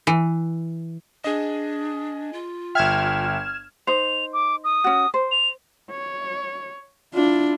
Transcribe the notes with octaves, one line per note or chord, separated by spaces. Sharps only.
E3
D4 G#4 D#5
F4
G1 E5 G5 F6 G#6 E7
D#4 C5 F7
D6
D#6
C#4 F#4
C5
F7
C#5
D4 E4 F4